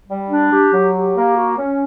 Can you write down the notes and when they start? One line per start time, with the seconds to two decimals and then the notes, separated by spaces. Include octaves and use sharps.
0.08 G3
0.30 D4
0.51 G4
0.73 F#3
0.93 G4
1.15 A#3
1.36 F#4
1.57 C#4